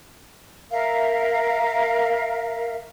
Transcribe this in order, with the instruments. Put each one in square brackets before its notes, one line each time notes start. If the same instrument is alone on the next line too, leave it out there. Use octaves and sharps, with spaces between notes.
[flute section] A#4 E5 F5